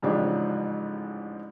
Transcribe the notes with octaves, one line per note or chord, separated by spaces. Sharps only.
A1 G#2 C#3 F3 D4 G4